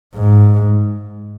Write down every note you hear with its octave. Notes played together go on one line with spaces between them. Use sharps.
G#2